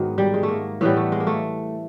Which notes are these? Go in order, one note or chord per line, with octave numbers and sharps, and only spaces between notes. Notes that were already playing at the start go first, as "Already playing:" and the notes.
Already playing: G#2 D#3 F#3 B3
G3
G#3
A3
A#3
A2 E3 G3 B3
A3
G#3
A#3
A3